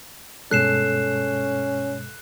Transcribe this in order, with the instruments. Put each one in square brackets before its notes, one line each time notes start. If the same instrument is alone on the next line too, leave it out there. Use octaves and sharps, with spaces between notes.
[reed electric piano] G2 B2 G#3 [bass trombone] C#4 [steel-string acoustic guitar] A4 [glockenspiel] F#6 C7 E7